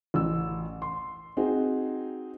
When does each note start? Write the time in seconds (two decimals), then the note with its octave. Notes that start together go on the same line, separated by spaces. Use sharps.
0.14 A1 E6
0.82 C6
1.37 C4 D#4 F#4 G#4